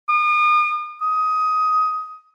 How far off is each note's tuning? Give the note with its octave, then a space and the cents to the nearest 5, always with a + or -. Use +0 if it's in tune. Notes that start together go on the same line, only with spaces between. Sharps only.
D#6 -40
D#6 +15